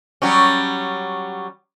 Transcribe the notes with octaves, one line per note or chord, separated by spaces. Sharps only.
F#3 G3 C#4